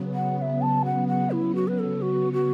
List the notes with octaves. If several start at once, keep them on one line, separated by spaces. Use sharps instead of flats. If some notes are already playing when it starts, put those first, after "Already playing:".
Already playing: C#3 F#3 B3
F#5
F#5
E5
A5
F#5
F#5
E4
F#4
B4
A4
F#4
F#4